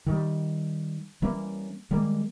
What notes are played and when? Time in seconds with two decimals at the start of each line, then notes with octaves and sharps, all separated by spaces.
0.06 D#3 G3
1.22 E3 G3 A#3 C#4
1.91 D#3 G3 G#3 A#3